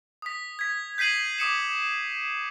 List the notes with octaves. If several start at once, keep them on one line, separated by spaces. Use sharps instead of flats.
D#6 B6
G#6 B6
G6 B6 C7 D#7 F#7
D6 D#6 C#7 E7